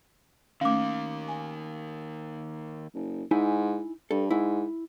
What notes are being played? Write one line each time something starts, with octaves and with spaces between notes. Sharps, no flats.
D#3 A3 A#3 C#4 F5 D6
G#5
F#1
G#2 D#4 E4 G#5
G2 A4
G#2 E4